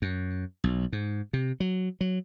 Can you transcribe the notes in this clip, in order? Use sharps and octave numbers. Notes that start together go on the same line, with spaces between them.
F#2
B1
G#2
C3
F#3
F#3